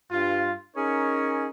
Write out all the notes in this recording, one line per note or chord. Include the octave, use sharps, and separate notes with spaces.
G2 F4
C#4 D#4 G#4 A#4 C#5